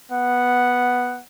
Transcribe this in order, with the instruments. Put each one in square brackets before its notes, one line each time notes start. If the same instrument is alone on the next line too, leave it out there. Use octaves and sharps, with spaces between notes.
[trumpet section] B3 F#5